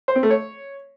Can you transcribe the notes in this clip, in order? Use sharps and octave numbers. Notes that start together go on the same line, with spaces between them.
C5
C4
A3
C#5